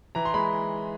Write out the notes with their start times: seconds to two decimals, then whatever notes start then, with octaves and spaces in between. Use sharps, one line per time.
0.15 E3 A#5
0.25 C6
0.34 G#3 B5